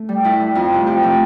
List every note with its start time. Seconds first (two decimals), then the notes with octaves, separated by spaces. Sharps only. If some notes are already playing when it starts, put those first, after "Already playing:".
Already playing: A3
0.09 G3
0.25 A2 E4
0.40 G3
0.55 F2 F4
0.72 C3 F3 A3
0.86 F2 G4
1.02 C3 F3 A3 A4